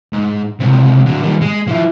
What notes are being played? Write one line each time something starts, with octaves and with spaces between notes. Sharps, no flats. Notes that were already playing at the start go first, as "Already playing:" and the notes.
G#2
C#2 C3
D3 F#3
D#3 G3
G#3
F3 E4